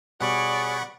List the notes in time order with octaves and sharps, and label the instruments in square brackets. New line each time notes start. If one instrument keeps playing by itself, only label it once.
[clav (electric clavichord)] B2 G3 [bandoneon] G#4 C#5 [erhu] D5 [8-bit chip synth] F#5 B5 C#6